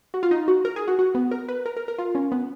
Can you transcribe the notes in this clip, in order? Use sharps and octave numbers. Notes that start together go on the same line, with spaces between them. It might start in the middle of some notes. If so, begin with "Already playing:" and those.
F#4
F4
D#4
F#4
A#4
G#4
F#4
F#4
B3
A#4
B4
A#4
A#4
A#4
F4
C#4
B3